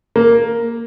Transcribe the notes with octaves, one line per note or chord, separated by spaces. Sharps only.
A#3